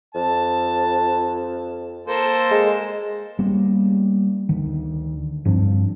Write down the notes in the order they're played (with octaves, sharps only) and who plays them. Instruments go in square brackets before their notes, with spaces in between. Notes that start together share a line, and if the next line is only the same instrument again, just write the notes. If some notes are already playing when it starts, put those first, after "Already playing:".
[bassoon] F2 [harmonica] A5
[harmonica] A#3 A4 C5
[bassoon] G#3
[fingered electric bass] G3 A#3 B3 C#4
D2 D#3
G2 F3 C4 D4